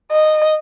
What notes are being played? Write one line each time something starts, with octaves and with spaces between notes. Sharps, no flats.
D#5